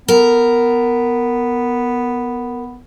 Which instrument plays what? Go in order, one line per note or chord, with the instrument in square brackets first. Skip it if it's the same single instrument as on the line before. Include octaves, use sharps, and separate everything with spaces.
[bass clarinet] B3 [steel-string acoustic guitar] A#4